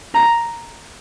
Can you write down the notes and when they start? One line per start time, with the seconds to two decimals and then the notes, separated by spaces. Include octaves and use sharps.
0.15 A#5